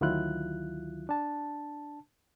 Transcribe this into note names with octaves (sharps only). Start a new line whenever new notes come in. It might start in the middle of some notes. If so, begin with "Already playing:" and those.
D2 D#3 F#3 E4 F4 F#6
D4 A5